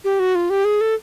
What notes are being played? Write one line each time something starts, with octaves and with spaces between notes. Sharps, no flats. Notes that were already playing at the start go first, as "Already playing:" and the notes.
G4
F#4
F4
G4
G#4
A4